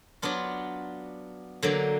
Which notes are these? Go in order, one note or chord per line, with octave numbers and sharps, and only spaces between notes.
F#3 B3 D4 F4
D3 F#3 A#3